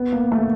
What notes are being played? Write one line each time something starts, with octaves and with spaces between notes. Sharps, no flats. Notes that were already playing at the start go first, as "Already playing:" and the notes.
Already playing: B3
A#3
A3